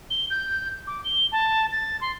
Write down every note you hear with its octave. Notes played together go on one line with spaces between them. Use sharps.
G7
G6
D6
G7
A5
A6
C6